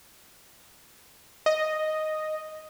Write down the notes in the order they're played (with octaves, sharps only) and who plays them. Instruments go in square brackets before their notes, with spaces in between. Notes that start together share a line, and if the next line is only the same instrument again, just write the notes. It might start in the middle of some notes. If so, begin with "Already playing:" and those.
[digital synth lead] D#5